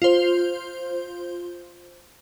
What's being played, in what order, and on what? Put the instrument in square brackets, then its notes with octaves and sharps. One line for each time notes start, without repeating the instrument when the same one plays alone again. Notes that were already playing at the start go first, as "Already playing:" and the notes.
[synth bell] F4 C5